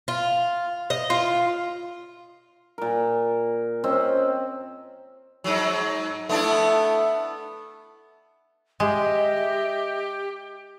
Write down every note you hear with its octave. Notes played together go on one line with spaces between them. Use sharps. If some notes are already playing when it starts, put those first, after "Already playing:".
F4
D#5
F4
A#2 A#4
C4 C#4 D#5
G#2 F#3
A3 B3 D4 E4
G#3 G4 D#5 E5